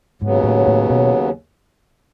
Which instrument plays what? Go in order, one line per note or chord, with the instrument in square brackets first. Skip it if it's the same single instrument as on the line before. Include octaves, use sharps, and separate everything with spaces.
[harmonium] D#2 C#3 F#3 B3 [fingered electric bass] G#2
[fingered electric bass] A2
A2
B2